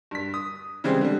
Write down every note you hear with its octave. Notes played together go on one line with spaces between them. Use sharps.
G2 B6
D#6
C#3 E3 G3 G#3 C4
D3 G3